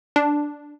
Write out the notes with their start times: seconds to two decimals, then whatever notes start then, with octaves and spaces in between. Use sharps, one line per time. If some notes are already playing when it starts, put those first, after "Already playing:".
0.16 D4